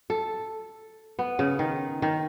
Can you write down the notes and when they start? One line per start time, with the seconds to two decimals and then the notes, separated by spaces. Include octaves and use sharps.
0.10 A4
1.19 B3
1.39 C#3
1.59 D#3
2.02 D#3